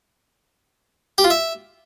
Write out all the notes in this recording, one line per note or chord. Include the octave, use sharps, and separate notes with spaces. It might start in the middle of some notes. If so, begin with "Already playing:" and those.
G4
F4
E5